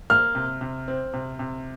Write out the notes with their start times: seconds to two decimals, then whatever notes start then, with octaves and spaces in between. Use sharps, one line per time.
0.10 A#3 F6
0.35 C3
0.61 C3
0.88 C4
1.14 C3
1.39 C3